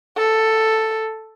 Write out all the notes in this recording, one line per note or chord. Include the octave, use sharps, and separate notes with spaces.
A4